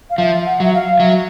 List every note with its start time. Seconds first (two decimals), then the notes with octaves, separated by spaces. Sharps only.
0.10 F5
0.18 F3 E5
0.46 F#5
0.60 F#3 E5
0.74 F5
1.00 F#3 E5